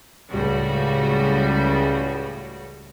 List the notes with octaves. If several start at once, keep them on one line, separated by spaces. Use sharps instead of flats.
C#2 A2 C#3 G3 F#4